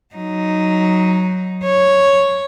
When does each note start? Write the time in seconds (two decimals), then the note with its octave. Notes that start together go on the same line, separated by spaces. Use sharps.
0.15 F#3 D#4
1.64 C#5